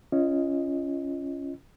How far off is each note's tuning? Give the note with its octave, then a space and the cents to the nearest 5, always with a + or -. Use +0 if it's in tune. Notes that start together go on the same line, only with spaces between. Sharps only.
C#4 +0 F4 -30 D#5 +0